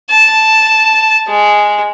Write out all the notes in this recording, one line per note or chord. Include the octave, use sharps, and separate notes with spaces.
A5
G#3